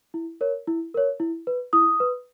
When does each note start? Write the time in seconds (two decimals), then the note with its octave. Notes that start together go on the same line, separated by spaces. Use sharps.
0.14 E4
0.41 A#4 C#5
0.67 E4
0.94 A#4 C#5
1.20 E4
1.47 B4
1.73 E4 D#6
2.00 B4